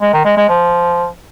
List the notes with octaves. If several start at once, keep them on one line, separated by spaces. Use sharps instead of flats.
G#3
D#3
G#3
G#3
F3